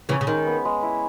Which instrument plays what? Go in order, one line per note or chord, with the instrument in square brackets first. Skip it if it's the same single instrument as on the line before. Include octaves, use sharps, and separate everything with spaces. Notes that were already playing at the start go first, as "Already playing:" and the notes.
[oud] C#3 E3 [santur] C#4
[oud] C#3
[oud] D#3 [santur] G#3
[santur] B3
G#3
E4